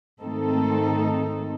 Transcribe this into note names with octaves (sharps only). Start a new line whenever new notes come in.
G#2 D#3 A3 C4 D#4 A4